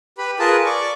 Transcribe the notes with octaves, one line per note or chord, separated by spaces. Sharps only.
G4 B4 B5
F4 G#4 A#4 B4 A5
D5 C#6 D6